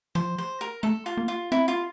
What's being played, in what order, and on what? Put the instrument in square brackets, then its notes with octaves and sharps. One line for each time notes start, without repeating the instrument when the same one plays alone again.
[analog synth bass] F3 [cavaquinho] C5
[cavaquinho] C5
A#4
[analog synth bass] A3 [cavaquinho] A4
[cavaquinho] F4
[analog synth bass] A#3
[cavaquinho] F4
[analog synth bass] C4 [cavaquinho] E4
[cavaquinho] F4